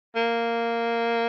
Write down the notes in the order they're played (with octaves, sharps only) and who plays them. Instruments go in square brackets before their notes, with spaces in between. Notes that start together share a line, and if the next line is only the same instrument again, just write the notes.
[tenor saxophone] A#3